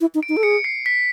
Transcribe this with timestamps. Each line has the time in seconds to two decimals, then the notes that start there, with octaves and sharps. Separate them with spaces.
0.01 E4
0.15 D#4
0.23 D7
0.29 D#4
0.37 A4
0.43 G#4 C#7
0.64 C7
0.86 B6